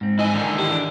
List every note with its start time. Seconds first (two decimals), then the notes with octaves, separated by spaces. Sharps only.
0.01 G#2 C4
0.19 E4 D#5 G#5
0.32 D3 D#3
0.58 E4 G4
0.71 D4